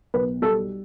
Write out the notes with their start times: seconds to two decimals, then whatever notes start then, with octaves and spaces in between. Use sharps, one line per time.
0.14 B1 B4
0.42 G3 A4